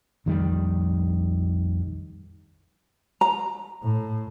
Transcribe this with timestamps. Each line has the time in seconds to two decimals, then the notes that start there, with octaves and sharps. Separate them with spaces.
0.26 A#1 F2 D#3 G3
3.21 A#5
3.83 A2